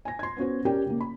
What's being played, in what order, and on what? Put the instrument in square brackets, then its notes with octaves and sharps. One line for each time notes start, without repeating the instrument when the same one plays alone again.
[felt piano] G#5 A#6
C6 G#6
B3 C#4 F#4 C5
C#4 G4 A#4 D5 G5
C#3 A#3
B5